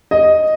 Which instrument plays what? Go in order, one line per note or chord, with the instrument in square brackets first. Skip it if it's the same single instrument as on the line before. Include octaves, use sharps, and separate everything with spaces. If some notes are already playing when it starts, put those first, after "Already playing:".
[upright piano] D#5